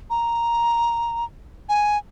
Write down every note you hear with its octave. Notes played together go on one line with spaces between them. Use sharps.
A#5
G#5